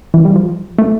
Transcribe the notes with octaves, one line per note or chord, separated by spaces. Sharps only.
E3
G3
F3
A3